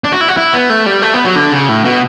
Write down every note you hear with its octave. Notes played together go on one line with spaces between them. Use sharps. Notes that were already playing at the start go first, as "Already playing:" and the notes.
D4
F#4
E4
F#4
E4
B3
A3
G3
A3
B3
F#3
D3
C#3
A2
B2